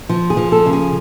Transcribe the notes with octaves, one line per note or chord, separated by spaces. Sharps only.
F3
G#4
F3
A4
C#3
G#4